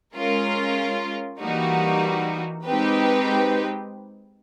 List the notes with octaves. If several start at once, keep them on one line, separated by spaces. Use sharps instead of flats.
G#3 C#4 F4 A#4
E3 G3 A#3 D#4 F#4
G#3 C4 D#4 G4 B4